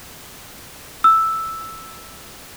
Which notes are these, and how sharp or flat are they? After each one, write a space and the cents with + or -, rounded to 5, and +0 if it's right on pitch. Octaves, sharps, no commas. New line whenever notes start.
E6 +0